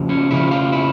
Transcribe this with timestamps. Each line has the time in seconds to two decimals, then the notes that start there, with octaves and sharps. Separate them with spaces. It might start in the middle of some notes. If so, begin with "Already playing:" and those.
Already playing: F2 C#3 F3
0.09 C#4
0.31 F2 C#3 F3 E4
0.51 F4
0.72 E4